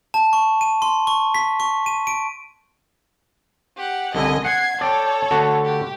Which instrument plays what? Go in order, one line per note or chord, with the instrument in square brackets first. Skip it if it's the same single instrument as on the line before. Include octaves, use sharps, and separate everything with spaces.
[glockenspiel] A5
C#6
D#7
C6
C#6
B6
C#6
D#7
D7
[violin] G4 F#5
[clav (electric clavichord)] C2 D3 E4 [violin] D#5 G#5
[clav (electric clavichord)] F#5 [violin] G#6 C7
[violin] A4 C#5 [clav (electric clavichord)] D5 G5
[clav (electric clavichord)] D3 A3 F#4
[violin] G4